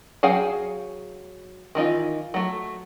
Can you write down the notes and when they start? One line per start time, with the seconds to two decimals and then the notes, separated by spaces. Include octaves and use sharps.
0.23 F#3 G#4 F5 G5 G#5
1.75 D#3 E3 D#4 F4
2.34 F#3 A3